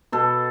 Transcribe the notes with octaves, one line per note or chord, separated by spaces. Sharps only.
B2 A4